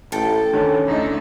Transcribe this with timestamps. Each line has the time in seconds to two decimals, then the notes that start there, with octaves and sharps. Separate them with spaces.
0.12 A1 A4 G5
0.53 D2 D3 D#3 C#4
0.88 E2 D3 A3 D4 D#4